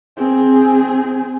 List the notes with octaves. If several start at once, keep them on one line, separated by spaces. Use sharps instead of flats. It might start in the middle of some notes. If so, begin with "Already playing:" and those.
C4 G#4